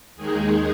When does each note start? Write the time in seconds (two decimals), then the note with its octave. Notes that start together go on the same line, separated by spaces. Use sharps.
0.16 D#2 D#3 G#3 D#4 G#4